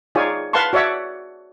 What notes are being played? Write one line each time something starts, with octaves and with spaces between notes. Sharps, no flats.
D#4 F4 G#4 C#5 D5 G#5
B4 F5 F#5 A5 C6 C#6
F#4 C#5 D5 E5 F#5